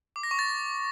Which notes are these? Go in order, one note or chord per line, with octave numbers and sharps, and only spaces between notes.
D6
A#6
C#6
A6